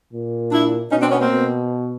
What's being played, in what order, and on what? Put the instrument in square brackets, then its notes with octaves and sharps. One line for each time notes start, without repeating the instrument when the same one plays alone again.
[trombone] A#2
[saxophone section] D4 E4
[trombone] B2 [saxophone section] C#4 D#4
[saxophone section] C4 D4
B3 C#4
A#3 C4
[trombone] B2